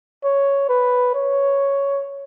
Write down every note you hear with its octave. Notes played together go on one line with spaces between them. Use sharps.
C#5
B4
C#5